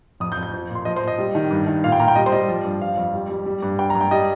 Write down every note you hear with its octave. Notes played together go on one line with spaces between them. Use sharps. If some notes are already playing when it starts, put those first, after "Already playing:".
F2 D#6
G6
F2
G6
F3
A#2
C6
F3 D#5
C5
A#2
D#5
G3
D#3
G2
D#3
A#2 F5
G5
A#2 A#5
G5
G3 D#5
C5
G3 D#5
F3
G2
F3 F5
F2
G3
G3
G3
G2
G2 G5
A#5
G2
G5
G3 D#5